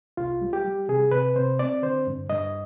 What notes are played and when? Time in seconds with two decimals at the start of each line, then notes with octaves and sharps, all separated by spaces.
0.17 C2 F4
0.41 G3
0.53 G4
0.65 G3
0.88 C3 G#4
1.11 C3 B4
1.36 C3 C5
1.59 C4 D5
1.82 D3 C5
2.07 G2
2.29 G2 D#5